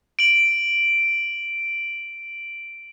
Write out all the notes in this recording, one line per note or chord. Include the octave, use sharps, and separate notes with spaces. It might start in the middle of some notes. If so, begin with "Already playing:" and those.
D7 F#7